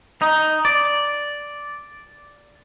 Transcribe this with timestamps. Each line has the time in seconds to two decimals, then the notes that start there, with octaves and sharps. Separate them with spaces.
0.22 D#4
0.65 D5